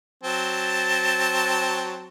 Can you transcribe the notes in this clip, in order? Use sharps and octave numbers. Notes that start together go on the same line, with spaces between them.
F#3 C4 A5